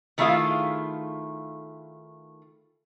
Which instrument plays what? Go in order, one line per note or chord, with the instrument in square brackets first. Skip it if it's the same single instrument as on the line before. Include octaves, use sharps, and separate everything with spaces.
[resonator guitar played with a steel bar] D#3 A3 E4 F4 G#4 F5